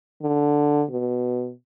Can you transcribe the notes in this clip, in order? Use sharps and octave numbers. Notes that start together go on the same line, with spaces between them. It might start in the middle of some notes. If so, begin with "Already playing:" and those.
D3
B2